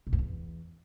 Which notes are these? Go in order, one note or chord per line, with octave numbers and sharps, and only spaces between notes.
B2
F2
E2